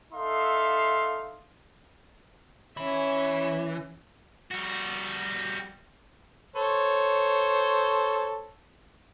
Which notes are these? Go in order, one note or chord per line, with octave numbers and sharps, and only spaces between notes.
D#4 A4 E5 F5 C6
E3 C#4 E5
G3 F#4
A4 C5 C#5